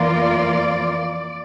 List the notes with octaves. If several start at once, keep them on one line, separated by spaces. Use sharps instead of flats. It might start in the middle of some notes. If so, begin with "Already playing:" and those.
Already playing: F2 E3 A#3 F4 D5